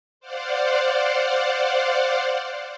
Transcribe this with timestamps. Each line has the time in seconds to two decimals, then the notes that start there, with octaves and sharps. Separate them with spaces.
0.20 C5 D5 F5 F#5